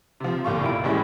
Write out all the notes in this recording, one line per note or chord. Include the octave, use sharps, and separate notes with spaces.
C3 F3
G1 A#2 F4 C#6
F1 E4 D7
A2 E3 G3 G#3 C#4 E4